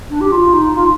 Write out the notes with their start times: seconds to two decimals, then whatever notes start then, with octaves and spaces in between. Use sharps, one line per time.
0.10 D4
0.21 G4
0.32 F4
0.53 D#4
0.75 F4